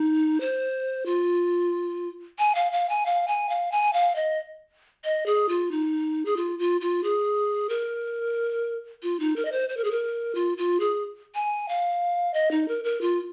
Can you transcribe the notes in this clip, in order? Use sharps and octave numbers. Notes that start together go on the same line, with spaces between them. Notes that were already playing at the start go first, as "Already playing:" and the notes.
Already playing: D#4
C5
F4
G#5
F5
F5
G#5
F5
G#5
F5
G#5
F5
D#5
D#5
G#4
F4
D#4
G#4
F4
F4
F4
G#4
A#4
F4
D#4
A#4
D#5
C5
C5
A#4
G#4
A#4
F4
F4
G#4
G#5
F5
D#5
D#4
A#4
A#4
F4